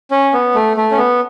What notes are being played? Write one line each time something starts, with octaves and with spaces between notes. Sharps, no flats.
C#4
B3
A3
A3
C#4
B3